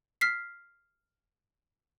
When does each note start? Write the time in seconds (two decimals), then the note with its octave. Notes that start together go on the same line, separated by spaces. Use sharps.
0.21 F6 B6 C7